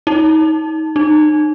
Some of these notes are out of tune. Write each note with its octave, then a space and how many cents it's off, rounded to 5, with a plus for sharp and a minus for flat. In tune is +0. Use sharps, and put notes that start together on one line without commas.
D#4 +30
D#4 -40